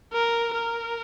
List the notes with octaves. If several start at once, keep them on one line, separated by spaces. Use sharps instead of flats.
A#4
A#4